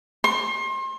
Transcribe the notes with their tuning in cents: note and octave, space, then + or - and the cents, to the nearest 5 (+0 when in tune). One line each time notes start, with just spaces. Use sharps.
C6 +35